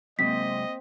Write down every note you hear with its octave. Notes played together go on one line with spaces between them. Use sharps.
F#2 C3 G#3 A#3 C4 D#5 B6